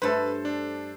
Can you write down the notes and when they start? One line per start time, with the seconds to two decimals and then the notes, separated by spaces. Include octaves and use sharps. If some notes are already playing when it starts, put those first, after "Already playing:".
0.02 G2 A3 A4 B4 C5
0.45 D4